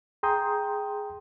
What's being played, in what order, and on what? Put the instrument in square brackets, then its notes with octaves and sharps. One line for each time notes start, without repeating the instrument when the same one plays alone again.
[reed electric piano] G#4 G5 A#5 C6 D#6 G6